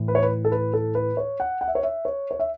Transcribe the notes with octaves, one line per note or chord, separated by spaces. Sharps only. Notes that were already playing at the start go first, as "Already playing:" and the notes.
Already playing: A2 E3
B4
C#5
B4
A4
B4
A4
B4
C#5
F#5
F#5
E5
C#5
E5
C#5
C#5
E5